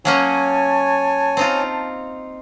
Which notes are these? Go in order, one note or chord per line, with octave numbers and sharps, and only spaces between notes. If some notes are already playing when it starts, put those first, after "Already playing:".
F#3 A#3 C#4 C#5 G#5 A5
C4 D#4 F4